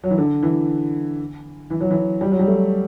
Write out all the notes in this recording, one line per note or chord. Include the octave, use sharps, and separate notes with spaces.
F#3
E3
D3
E3
E3
F#3
E3
G3
F#3
G3
A3